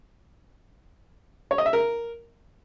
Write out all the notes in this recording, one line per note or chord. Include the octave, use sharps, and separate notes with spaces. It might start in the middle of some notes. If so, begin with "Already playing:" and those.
C#5
D#5
E5
A#4